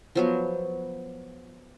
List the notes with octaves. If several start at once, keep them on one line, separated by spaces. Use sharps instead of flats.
F3 F#3 B3